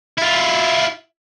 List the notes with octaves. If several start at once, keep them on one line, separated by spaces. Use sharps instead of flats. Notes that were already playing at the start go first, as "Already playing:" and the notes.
E4 F4